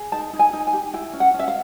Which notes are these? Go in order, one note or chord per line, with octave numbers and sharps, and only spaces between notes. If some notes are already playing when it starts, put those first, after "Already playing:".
Already playing: G#4
D#4 A5
D#4
G#5
D#4
G#5
G4
E4 G5
C#4
F#5
C#4
E5
F5